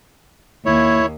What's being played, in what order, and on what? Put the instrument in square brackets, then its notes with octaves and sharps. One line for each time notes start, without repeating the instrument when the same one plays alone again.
[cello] D#2 [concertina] E4 C#5